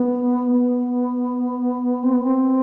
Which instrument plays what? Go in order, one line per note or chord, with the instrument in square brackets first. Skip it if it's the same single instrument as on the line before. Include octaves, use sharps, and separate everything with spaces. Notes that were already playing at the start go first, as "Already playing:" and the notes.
Already playing: [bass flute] B3
B3
C4
B3
C4